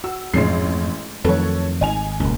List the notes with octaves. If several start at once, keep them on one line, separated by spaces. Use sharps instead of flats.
F#4 E6
A1 F2 G#2 G#3 C#4 C7
F2 D#3 F#3 A3 A4 B4 C#5
G#1 D#4 G#5 F7
D#1 C#2 C#3 A#3